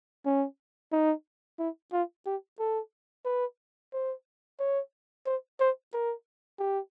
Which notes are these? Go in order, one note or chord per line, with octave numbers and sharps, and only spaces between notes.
C#4
D#4
E4
F4
G4
A4
B4
C5
C#5
C5
C5
A#4
G4